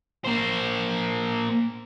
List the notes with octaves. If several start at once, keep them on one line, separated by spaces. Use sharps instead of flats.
A#3 C5